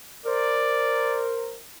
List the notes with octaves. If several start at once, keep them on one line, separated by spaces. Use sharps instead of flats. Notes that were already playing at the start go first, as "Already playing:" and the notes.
A#4 C5 D5